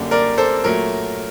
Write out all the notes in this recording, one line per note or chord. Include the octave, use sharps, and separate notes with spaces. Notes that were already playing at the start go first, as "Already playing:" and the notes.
Already playing: F#2 D3 G3 A#3
A#4 D5
A4 C5
A#2 F#3 A3 A#4